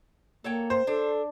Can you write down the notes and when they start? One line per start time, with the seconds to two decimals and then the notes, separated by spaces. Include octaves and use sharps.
0.44 A#3 A4 C#5 G5
0.70 C5
0.87 D4 A4